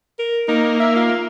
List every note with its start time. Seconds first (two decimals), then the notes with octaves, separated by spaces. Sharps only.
0.19 A#4
0.48 A#3 D#4
0.80 E5
0.95 F4